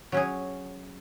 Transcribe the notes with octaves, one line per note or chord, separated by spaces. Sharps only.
F#3 C#4 G#4